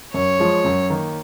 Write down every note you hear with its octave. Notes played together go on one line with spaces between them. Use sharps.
F#2 C#5
F3 G#3
F#2
D#3 A#3